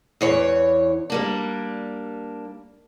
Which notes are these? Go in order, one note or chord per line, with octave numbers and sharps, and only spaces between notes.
E2 E3 C#5
G3 A#3 D4